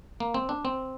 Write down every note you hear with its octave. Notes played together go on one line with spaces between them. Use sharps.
A#3
C4
D4
C4